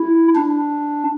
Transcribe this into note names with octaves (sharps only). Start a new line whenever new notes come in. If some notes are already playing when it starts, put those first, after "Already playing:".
Already playing: E4
D4